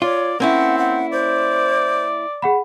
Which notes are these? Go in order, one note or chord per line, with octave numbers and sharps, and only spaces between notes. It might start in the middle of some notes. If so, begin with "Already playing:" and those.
F4 C#5 D5
A#3 C4 C#4 E4 F#5
F#5
C5 D5
G#4 F#5 B5